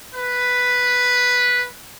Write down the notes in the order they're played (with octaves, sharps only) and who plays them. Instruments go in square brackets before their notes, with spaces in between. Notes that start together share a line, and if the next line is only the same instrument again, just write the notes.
[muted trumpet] B4